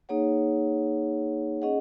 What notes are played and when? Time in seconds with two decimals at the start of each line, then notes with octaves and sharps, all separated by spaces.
0.09 A#3 D#4 G#4 C#5 F#5
1.62 C#4 G#4 D#5 F#5